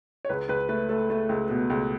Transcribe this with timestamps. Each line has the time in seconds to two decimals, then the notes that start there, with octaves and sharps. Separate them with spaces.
0.25 C#5
0.29 C#2 B4
0.49 C#2 B4
0.69 A3 B4
0.89 A3 A4
1.10 A3
1.29 C#2
1.49 B2
1.70 C#2